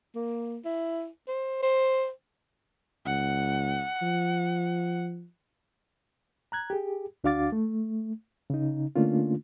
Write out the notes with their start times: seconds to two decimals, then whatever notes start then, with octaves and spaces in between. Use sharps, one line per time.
0.15 A#3
0.65 E4
1.28 C5
1.62 C5
3.06 C#2 F#5
4.02 F3
6.52 A#5 F#6 G#6
6.70 G4 G#4
7.24 D2 D4 F#4 F5 D6 A6
7.52 A3
8.50 C#3 D#4
8.96 D3 A3 A#3 C#4 D4 F4